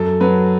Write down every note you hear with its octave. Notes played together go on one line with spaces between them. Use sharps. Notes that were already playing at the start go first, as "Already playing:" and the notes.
Already playing: F#2 A4
F#3 B4